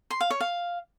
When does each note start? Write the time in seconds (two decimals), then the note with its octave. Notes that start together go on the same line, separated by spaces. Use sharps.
0.11 C6
0.21 F5
0.31 C#5
0.41 F5